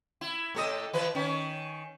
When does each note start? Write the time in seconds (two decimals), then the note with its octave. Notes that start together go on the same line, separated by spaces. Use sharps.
0.21 E4
0.55 A2 A4 D#5
0.93 E3 B4
1.15 D#3 C#4